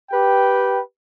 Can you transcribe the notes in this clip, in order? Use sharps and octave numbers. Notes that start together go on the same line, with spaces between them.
G4 B4 G5